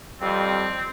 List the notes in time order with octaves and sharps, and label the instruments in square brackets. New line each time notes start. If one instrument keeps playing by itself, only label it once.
[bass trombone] F2 [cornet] G3 [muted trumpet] C4